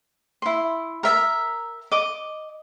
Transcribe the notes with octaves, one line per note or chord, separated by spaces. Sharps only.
E4 C6
A#4 E5 A#5
D#5 D6